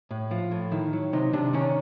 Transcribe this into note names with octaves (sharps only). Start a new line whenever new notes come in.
A2
F3 F4
A2
D#3 E4
F#3
C3 D#4
C3 D4
D#3 C#4